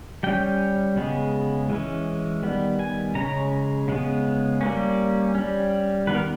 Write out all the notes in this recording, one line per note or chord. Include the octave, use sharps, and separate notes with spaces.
G3 C#4 G5
C#3 G#3 B3
E3 G#3 C#4
D#3 G3 B3
G#5
C#3 G#3 C#4 A#5
C#3 G#3 B3
G3 A#3 C#4
G3 C#4
D#3 G3 B3 B4
A#4